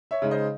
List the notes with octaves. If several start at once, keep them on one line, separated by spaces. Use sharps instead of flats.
C#5 E5
C#3 G#3 D#4
C5 D#5